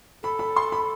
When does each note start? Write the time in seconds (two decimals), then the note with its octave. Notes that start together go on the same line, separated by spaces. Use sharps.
0.23 A4 B5
0.39 B5
0.56 C6
0.72 B5